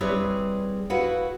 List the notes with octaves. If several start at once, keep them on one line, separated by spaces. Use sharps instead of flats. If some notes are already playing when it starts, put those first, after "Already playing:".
G3 C4 E4 G#4 B4 C#5
E4 F#4 G#4 B4 F5 F#5